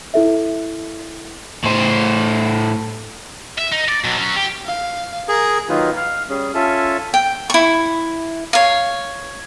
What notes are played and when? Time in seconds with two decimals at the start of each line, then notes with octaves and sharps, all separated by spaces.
0.14 E4 A4 E5
1.64 A2 C5
3.58 E5
3.72 D#4
3.88 D5
4.04 B2 F#3
4.17 F#3 C#4
4.36 G4
4.66 F5
5.29 G#4 A#4
5.69 D#3 F#3 A#3 D#4 F4 B4
5.96 F5
6.29 G3 C#4 G#4
6.55 C#4 F4 A4 E5 G#5 A5
7.14 G5
7.50 E4 C#6
8.53 C#5 F5